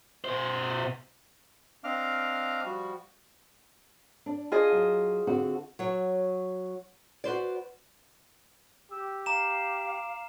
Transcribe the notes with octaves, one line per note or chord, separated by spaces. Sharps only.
B2 C5
C4 D4 D#5 F5 D6 F6
F3 G3 F#4
D4
F4 G#4 D#5
F#3
D3 C4 F#4
F#3 C#5
F#4 B4 C5 D5
G4 E6
F5 A#5 D6 E7